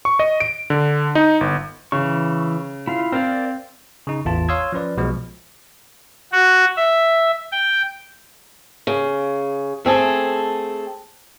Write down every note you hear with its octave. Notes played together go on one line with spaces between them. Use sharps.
C#6
D#5
D7
D3
D#4
G1
C#3 E3 C#6
E4 F4 F5
C4 A#4 D5 F5
C#3 D#4
A1 E2 F4 A5
C#5 F5 C6 D#6 E6 G#6
F3 C#4 B4 D5
B1 B2 F3 G#3
F#4
E5
G5
C#3
A3 C4 G#4 A4